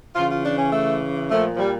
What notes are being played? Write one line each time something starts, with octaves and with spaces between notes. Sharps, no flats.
C#3 E3 F4
F4
D4
C#4
A3
A#2 F3 A3
F3
G3